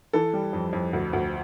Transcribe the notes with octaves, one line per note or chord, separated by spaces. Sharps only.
E3 A4
G3
F2
F2
D2
D2